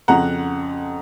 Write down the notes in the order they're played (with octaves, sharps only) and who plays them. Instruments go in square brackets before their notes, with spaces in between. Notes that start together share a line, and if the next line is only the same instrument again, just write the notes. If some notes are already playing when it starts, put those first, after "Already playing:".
[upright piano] F2 C#3 F3 F#5 A#5